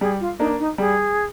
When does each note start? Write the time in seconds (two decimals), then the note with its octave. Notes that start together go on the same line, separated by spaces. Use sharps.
0.01 G3 G#4
0.21 F4
0.39 A#3 D4 D#4
0.59 D#4
0.78 G3 G#4